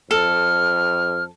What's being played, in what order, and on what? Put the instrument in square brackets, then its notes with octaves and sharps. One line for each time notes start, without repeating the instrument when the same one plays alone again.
[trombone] F2 [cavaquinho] A4 [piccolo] F6